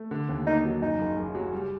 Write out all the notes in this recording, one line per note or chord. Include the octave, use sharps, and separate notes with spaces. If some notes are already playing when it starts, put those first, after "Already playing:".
Already playing: A3
D3
D#2
A#3 D#4
F#3
F#2 D#4
F#1
F#1
F#3
G3